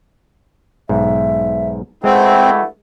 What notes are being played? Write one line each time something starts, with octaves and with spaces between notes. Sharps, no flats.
B1 G#2 E5
G2 G#3 A3 C4 E4 F#5